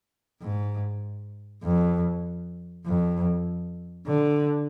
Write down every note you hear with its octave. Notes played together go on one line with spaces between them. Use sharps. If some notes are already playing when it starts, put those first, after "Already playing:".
G#2
F2
F2
D3